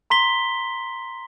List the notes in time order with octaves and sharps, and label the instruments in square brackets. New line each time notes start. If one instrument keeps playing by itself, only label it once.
[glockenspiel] A#5 C6 B6 G7